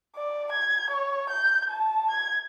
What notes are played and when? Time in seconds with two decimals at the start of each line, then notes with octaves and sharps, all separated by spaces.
0.15 D5
0.52 G#6
0.90 C#5
1.30 G6
1.70 A5
2.10 G#6